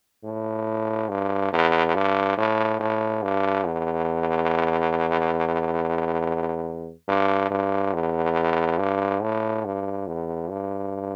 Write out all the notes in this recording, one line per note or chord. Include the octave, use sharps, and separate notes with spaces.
A2
G2
E2
G2
A2
A2
G2
E2
G2
G2
E2
G2
A2
G2
E2
G2